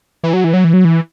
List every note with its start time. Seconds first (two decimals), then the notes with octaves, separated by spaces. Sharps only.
0.23 E3
0.33 F#3
0.44 E3
0.53 F#3
0.64 E3
0.73 F#3
0.85 E3